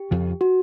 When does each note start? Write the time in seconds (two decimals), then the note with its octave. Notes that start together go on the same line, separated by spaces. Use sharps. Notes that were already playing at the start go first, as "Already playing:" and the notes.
Already playing: G4
0.11 F2 C#3 F3
0.41 F#4